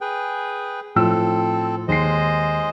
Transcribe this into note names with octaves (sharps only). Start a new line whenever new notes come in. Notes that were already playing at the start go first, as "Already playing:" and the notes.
G#4 B4 G5
A2 F3 C4 A4 E6
D#2 G#3 C5 D#5 C7